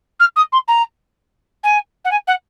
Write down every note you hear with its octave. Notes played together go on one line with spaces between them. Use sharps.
F6
D#6
C6
A#5
G#5
F#5
G#5
F#5